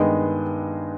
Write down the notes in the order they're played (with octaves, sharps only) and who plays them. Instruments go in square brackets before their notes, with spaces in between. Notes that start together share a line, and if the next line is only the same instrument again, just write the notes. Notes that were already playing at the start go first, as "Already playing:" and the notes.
Already playing: [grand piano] G2 D#3 G#3 B3 D#5 G5